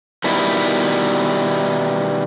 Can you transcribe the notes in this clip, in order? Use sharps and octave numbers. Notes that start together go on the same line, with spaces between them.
B2 D#3 G3 E4